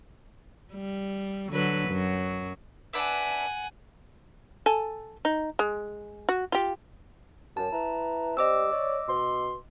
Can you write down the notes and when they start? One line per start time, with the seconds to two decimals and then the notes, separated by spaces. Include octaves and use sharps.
0.74 G3
1.50 D3 F#3 B4
1.89 F#2 F#3
2.93 D4 B4 E5 F#5 G#5
4.66 A4 G#5
5.25 D#4
5.59 G#3
6.29 F#4
6.52 F4 G4
7.57 F#2 A5
7.73 E4 B4 A#5
8.37 G3 C4 D#5 D6 E6
8.72 C#5 D5
9.08 B2 C6